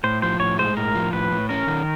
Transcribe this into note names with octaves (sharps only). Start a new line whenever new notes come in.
A2 C5
F3 C5
A2 C#5
G#3 C5
A2 A#4
F3
A2 B4
A2
C#4 A#4
D#3